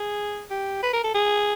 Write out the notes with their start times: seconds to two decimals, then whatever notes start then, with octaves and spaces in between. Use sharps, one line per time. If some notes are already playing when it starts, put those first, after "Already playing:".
Already playing: G#4
0.50 G4
0.83 B4
0.93 A#4
1.04 A4
1.14 G#4